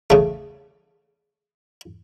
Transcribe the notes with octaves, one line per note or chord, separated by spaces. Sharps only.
C#3 A3